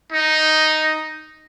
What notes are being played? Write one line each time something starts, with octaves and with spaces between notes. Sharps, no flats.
D#4